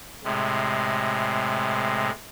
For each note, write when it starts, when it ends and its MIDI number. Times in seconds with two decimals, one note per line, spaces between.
0.24 2.10 45
0.24 2.10 48
0.24 2.10 56